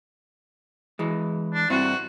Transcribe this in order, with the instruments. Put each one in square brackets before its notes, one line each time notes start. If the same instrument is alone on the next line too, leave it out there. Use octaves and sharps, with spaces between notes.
[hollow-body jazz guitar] E3 G#3
[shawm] D4
[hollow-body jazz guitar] G2 C4 E4 [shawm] F#4